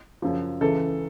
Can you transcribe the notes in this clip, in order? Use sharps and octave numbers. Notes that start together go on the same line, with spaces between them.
F#2 C#3 F3
C#2 C#3 E3 A4